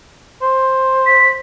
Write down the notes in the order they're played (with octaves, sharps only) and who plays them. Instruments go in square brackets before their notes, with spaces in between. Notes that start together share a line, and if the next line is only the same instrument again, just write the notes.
[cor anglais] C5
[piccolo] B6